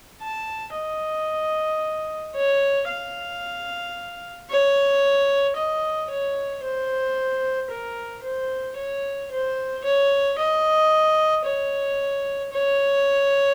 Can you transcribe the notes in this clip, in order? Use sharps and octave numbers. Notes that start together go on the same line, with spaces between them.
A5
D#5
C#5
F5
C#5
D#5
C#5
C5
A#4
C5
C#5
C5
C#5
D#5
C#5
C#5